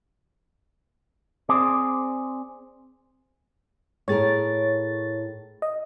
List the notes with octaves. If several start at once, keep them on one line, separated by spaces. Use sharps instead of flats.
C4 G#4 D5
A2 G#4 A#4 C#5 A6
D#5